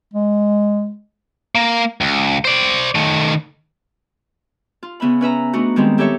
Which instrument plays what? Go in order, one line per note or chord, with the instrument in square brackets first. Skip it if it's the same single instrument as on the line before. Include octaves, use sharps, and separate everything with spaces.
[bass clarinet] G#3
[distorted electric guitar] A#3
C#2
C5 D5
D#3 A3
[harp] F4
C#3 B3 E5 B5
C#4 B4 E5 A#5
A3 B3 D4 D#4 F#4
D#3 G3 G#3 C4
E4 G4 A4 C#5 E5